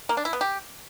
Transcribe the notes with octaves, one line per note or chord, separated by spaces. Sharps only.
A#3
D4
E4
B3
G4